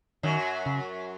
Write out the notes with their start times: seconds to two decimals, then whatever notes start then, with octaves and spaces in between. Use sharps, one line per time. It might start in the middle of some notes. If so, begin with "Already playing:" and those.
0.23 F#2 D#3 F#3
0.66 C#3